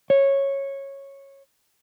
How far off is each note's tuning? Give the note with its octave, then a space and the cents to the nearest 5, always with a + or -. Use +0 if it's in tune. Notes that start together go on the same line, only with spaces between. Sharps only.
C#5 -10